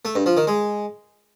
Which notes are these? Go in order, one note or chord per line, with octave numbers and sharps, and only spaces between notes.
A3
G2
F3
D#3
G#3